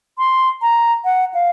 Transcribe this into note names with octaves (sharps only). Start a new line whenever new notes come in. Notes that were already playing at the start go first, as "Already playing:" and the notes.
C6
A#5
F#5
F5